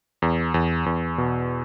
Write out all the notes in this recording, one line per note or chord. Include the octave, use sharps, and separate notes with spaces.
E2
E2
E2
B2